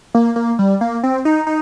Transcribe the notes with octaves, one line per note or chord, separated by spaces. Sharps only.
A#3
A#3
G3
A#3
C4
D#4
D#4